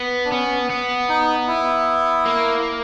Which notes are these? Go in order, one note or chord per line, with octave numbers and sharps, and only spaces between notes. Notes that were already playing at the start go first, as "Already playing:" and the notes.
Already playing: B3
D4
B3 C#4
B3
D#4
E4
A#3